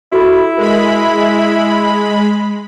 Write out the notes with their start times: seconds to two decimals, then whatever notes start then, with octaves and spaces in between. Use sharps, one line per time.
0.12 E4 F#4 A4 B5
0.58 G#3 A#4 B5